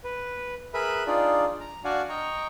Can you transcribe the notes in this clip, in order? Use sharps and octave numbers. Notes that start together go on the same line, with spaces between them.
B4
G#4 A#4 B4 E5 B5 F#6
D4 D#4 F4 G#4 D5
A#5
D4 F#4 D5 F5 F#5 G#5
D#5 G5 A#5 C#6